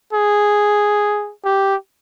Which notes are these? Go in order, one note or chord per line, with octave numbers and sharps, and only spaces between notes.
G#4
G4